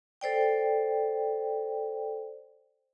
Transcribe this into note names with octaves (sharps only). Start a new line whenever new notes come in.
A4 C5 D5 G5